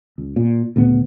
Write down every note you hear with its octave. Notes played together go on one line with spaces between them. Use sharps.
C#2
A#2
D2 A#2 C#3 B3